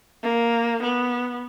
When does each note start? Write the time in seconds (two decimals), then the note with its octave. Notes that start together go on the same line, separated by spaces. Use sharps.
0.23 A#3
0.83 B3